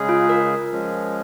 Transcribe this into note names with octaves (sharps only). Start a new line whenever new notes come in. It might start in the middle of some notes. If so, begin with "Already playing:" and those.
Already playing: C#3 G#3 C#4 G#4
F4
A#4
F3 G#3 C#4